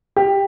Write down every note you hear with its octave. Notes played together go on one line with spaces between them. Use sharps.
G4